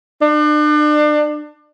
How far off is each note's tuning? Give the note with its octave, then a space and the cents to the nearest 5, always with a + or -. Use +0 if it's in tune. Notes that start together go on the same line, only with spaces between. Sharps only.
D4 +35